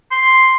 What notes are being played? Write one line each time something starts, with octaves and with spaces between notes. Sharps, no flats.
C6